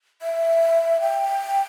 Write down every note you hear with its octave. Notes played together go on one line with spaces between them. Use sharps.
E5
G5